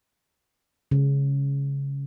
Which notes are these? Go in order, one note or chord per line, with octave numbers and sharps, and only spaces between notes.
C#3